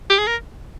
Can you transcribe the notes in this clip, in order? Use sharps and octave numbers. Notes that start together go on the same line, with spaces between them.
G4
G#4
A#4